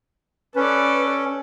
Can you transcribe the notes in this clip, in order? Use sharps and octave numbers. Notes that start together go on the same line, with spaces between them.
C#4 A4 B4 D5